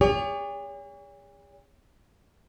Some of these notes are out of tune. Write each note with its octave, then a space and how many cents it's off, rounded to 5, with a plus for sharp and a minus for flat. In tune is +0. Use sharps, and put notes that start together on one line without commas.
G#4 -45 C#5 +45